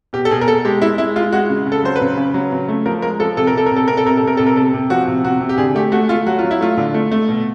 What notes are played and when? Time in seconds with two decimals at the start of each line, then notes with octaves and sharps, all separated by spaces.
0.13 B2 G4
0.25 A4
0.31 B2 G#4
0.41 A#4
0.47 B2 A4
0.65 G#3 G4
0.82 G#3 E4
0.98 G#3 E4
1.16 G#3 F4
1.32 G#3 F#4
1.49 C#3
1.66 C#3
1.72 A4
1.84 F#3 C5
1.96 B4
2.01 C#3
2.17 C#3
2.34 F#3
2.52 C#3
2.69 A3
2.86 F3 A#4
3.02 G#3 A#4
3.20 F3 A4
3.37 C3 A4
3.47 A#4
3.54 C3 A4
3.66 A#4
3.72 C3 A4
3.88 C3 A#4
3.97 A4
4.05 C3 A#4
4.17 A4
4.23 C3 A#4
4.37 C3 A4
4.47 A#4
4.56 C3 A4
4.73 C3
4.90 F3 F#4
5.08 C3
5.24 C3 F#4
5.41 C3
5.49 G4
5.58 D3 G#4
5.75 A3 G4
5.92 A3 F#4
6.09 A3 F4
6.26 F#3 F#4
6.39 F#3 F4
6.51 E4
6.61 A3 F4
6.77 D3
6.94 A3
7.11 A3
7.28 B2